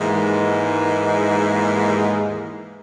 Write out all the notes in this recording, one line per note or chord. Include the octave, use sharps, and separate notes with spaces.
D#2 G#2 E3 G#3 A#3